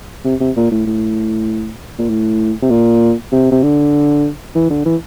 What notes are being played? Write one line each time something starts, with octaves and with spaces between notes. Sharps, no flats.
C3
C3
A#2
A2
A2
A#2
A2
C3
A#2
C3
C3
D3
E3
D3
E3